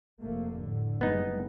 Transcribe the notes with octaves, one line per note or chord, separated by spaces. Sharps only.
F1 A3 A#3
A2 D3
F#1 G3 G#3 B3 D#4